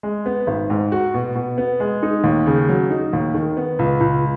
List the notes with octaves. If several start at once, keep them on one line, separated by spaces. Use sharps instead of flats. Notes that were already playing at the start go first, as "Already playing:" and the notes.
G#3
B3
G#1
G#2
F#4
B2
B2
B3
G#3
D#4
D#2
C#3
F#3
D#4
D#2
D#3
B3
C#2
C#2